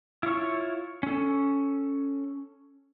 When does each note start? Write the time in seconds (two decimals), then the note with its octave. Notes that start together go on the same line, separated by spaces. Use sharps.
0.23 E4 F4 C#5 C#6
1.03 C#4 A4